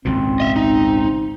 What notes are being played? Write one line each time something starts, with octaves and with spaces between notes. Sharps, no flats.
G#1 C#2 A#2 C4
D#5 E5
D#4